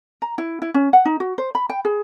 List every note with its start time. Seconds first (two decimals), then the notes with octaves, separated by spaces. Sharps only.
0.22 A#5
0.38 E4
0.62 E4
0.74 C#4
0.93 F#5
1.05 D#4
1.20 F#4
1.38 C5
1.55 B5
1.69 G5
1.85 G#4